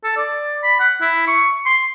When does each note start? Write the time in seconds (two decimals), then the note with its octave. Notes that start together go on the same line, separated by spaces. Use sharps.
0.04 A4
0.17 D5
0.63 B5
0.80 F#5
1.01 E4
1.27 C#6
1.66 C6